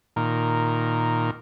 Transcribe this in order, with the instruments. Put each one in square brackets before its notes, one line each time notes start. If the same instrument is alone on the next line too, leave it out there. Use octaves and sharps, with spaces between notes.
[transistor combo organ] A#2 D#3 A#4